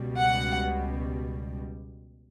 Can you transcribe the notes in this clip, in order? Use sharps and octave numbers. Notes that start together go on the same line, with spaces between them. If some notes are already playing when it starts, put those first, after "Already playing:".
Already playing: C#2 B2 G3
F#5